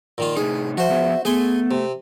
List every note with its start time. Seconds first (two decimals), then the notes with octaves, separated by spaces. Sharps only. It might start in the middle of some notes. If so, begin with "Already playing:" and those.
0.18 A#2 D#3 F4
0.37 A2 C3 D#4 G#4
0.77 F3 F#4 C5 E5
0.90 F3 B3 G#4
1.25 A3 B3 G#4 G#5 C6
1.71 C3